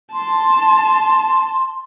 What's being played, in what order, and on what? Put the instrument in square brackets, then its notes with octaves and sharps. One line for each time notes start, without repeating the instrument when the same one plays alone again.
[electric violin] A5 [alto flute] C6